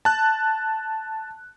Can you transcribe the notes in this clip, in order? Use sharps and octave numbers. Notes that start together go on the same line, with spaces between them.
A5 F#6